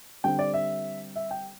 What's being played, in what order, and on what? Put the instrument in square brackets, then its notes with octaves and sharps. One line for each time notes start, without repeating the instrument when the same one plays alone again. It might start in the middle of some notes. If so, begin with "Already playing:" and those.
[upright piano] D3 G3 C4 G5
D5
E5
E5
G5